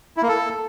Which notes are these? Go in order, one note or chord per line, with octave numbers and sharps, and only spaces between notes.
E4
A#3
A4